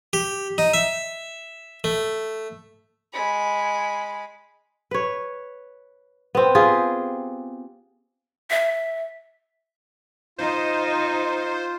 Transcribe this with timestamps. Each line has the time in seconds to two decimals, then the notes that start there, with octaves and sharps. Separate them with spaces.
0.13 G4
0.58 D#4
0.74 E5
1.84 A3
3.13 G#3 B5
4.91 B4 C#5
6.35 B3 C4
6.55 F4 G4 G#4
8.50 E5
10.38 D#4 F4 C5 D#5